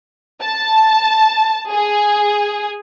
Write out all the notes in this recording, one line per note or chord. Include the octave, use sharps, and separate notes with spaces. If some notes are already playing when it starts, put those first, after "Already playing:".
A5
G#4